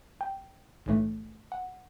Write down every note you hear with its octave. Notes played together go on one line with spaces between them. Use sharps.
G5
B1 A2 E3 A3
F#5